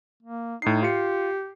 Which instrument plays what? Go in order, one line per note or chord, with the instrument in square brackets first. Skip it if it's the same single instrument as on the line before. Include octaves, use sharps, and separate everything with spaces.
[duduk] A#3
[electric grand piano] A2 C7 [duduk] D#4
[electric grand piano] F4 C#7 [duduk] G4